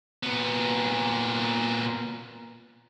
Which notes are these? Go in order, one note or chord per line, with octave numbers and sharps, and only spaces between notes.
A#2 B3